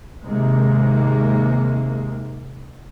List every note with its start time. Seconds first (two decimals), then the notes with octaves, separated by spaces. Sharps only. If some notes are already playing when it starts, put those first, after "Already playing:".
0.23 D#2 G#2 C3 G#3 A#3